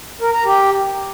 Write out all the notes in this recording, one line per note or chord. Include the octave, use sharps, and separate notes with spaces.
A#4
A#5
G4